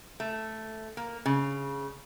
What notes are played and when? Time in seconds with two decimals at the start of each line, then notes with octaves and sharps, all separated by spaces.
0.20 A3
0.97 A#3
1.26 C#3